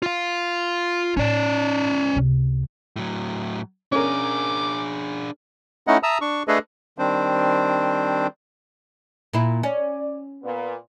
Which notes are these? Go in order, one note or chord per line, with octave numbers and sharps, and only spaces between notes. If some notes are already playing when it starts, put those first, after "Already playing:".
F4 F5
A2 C#4 E4 D5
C#2 C3
A2 F#3
C#4 D4 G#4 A#4 D6
A3 C#4 D#4 E4 D#5 F#5
E5 A5 A#5 D#6 E6
D4 C#6
A3 D4 G#4 A4 B4 D#5
D#3 G3 C4 D4 C5
A#2 E4
C#4 D5
A#2 B3